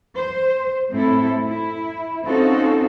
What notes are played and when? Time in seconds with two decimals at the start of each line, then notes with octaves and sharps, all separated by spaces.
0.17 C5
0.92 A2 C4 E4 A4
1.46 E4
2.24 C4 C#4 D#4 F4 F#4 A4